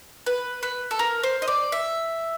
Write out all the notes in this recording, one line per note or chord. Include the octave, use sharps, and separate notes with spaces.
B4
B4
A4
A#4
C5
D#5
D5
E5